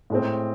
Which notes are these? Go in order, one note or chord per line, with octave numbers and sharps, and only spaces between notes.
A2 G#3 C4